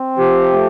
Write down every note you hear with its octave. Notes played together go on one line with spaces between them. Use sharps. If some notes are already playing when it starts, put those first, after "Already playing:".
Already playing: C4
F3 G4
A3